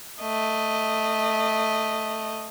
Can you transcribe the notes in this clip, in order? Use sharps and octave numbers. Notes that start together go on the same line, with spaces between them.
A3 D#5